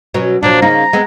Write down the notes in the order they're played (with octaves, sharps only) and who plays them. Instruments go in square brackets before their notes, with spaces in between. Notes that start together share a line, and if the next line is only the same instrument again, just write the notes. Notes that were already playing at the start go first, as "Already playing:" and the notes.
[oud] B2 F#3 C#4
[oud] A#2 F3 F#3 [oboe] D4
[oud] C#3 A#3 D#4 [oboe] A#5
[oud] G#3 B3 C4